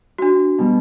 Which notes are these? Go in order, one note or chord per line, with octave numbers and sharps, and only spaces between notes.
D4 F#4
B2 G3